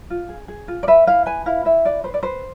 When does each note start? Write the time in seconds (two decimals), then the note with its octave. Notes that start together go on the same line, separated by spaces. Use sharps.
0.10 F4
0.29 G#4
0.48 G#4
0.68 F4
0.83 D5
0.88 B4 E5
1.07 E4 F5
1.26 B4 G#5
1.46 E4 F5
1.65 E4 E5
1.85 B4 D5
2.04 B4 C5
2.14 D5
2.23 B4 C5